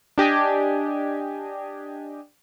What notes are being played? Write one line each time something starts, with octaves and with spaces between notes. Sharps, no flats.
D4 G4 D#5 G#5